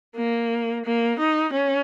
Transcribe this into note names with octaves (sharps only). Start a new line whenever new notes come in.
A#3
A#3
D#4
C#4